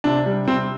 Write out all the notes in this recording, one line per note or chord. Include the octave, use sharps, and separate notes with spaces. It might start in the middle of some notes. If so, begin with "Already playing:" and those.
C3 D4
G3
C3 C4